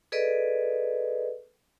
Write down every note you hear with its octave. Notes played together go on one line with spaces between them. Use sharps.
G#4 A4 B4 D5 D#5